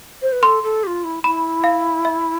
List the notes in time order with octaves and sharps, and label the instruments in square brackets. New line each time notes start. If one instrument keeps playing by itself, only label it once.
[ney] C5
B4
[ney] A4 [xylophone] C6
[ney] A4
G4
F4
E4
[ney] E4 [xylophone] B5
[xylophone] F5
E5